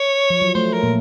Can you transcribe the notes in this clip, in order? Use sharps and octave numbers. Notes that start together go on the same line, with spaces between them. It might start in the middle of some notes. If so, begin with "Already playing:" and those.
Already playing: C#5
F3
F#3
A3 C5
A#4
A#2 A#3